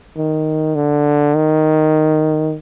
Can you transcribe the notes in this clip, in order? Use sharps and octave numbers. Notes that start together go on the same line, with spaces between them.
D#3
D3
D#3